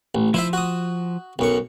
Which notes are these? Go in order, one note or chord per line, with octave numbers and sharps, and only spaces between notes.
A1
F3 E4 C5 E5
F#4 D#6
B1 F#2 C#6